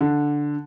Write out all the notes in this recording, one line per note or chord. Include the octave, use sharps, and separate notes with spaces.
D3